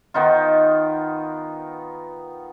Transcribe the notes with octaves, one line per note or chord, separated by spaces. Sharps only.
D#3 B3 D#4 F4